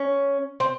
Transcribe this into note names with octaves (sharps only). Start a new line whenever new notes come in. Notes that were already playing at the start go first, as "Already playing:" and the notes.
Already playing: C#4
C4